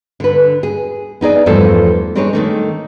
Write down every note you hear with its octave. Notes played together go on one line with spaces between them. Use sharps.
D3 B4
G#4
B3 D#4 G#4 D5
E2 G2 F3 A3 A4 C5
C4 D4 D#4 G#4 B4 C#5
D#3 A3 A#3